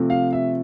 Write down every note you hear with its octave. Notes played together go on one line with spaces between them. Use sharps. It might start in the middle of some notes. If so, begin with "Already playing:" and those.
Already playing: C3 F3 A3 C4
F5
E5